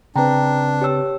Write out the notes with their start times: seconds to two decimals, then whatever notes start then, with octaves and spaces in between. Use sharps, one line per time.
0.16 C#3 C4 D4 B4 G5 A#5
0.81 G4 C#5 E6